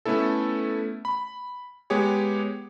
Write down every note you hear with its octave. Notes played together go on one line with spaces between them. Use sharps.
A3 B3 C#4 E4 A4
B5
G#3 B3 G4 G#4 C#5